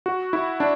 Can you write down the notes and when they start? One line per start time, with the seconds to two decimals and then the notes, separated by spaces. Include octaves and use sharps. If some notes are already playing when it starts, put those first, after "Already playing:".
0.06 F#4
0.33 E4
0.60 D4